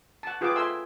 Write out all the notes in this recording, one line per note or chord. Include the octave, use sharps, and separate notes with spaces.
F#5 A5
F4 G#4 B4 F#5 G5 D6
A4 E5 G#5 C6 E6